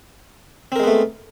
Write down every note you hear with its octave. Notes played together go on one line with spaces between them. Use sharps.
G#3 A3 B3 C4 A#4